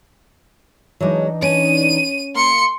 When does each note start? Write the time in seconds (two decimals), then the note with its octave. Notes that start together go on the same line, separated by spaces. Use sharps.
1.01 E3 F#3 G#3 D4 D#4
1.42 C#4 D#7
2.35 A#3 C6 C#7